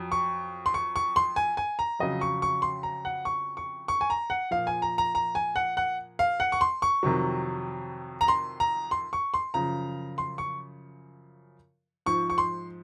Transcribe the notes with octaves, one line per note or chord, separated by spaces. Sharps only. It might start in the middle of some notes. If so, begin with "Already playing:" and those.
Already playing: F2 F#3
C#6
C6
C#6
C#6
C6
G#5
G#5
A#5
F2 C#3 F#3 D#5
C#6
C#6
C6
A#5
F#5
C#6
C#6
C#6
G#5
A#5
F#5
A#2 F3 F5
G#5
A#5
A#5
A#5
G#5
F#5
F#5
F5
F#5
C#6
C6
C#6
F2 C3 D#3 F#3
A#5
C6
A#5
C6
C#6
C6
F#2 C#3 F3 A#5
C6
C#6
G#2 F3 C#6
C#6
C6